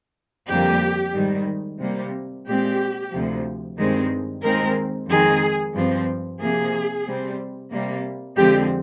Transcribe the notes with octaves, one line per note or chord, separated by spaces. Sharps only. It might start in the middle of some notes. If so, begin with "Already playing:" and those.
F2 D3 G3 A#3 G4
G#2 D#3 G3
C3 G3 A#3
A#2 G#3 C4 G4
D2 C3 F3
G2 D#3 G#3 C4
D#2 D#3 G#3 C4 A#4
F2 D#3 G#3 C4 G#4
G2 F3 C4
C3 F3 A#3 G#4
C3 G3 C4
C3 G3 A#3
F2 D3 F3 G#3 C4 G4